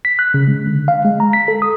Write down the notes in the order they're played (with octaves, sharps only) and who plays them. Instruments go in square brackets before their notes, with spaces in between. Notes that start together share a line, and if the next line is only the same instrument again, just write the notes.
[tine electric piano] B6
F#6
C#3
G#3
D3
F5
G#3
A#5
B6
A4
D#6